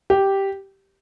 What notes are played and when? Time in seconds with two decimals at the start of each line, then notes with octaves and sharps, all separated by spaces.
0.10 G4